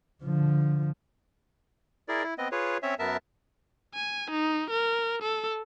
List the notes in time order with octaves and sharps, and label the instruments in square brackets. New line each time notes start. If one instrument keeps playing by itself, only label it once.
[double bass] D3 F3
[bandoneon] E4 G#4 A#4 D5
E4
B3 C4 D#5
F4 G#4 B4 C#5
C4 C#4 C#5 E5
F#2 B3 A#4 E5 A5
[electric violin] G#5
D#4
A#4
A4